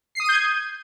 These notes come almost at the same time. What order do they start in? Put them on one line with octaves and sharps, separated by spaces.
C7 D#6 D#7 G6 G#6